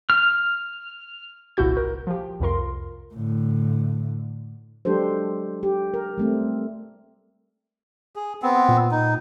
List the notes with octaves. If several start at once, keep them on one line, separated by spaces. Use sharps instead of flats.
F6
G1 C2 A#2 E4 F#4 G6
A#4
F3 G4
C2 F2 F4 A#4 C6
A2 D3
F#3 G#3 D4 G4 A4 C5
G4
A#4
G3 A3 C4
G#4
B3 C4
A#2
D#4